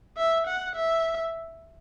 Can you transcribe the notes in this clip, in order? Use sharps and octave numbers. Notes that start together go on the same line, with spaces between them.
E5
F#5
E5